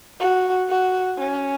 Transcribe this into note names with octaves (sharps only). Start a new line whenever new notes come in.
F#4
F#4
C#4